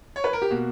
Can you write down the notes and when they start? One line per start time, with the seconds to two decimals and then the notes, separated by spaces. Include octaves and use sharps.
0.16 C#5
0.24 B4
0.33 A#4
0.42 G4
0.50 B2 A#3 F#4